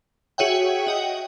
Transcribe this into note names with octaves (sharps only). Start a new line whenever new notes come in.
F#4 G#4 C#5 E5 F#5 G5
F#4 D#5 G5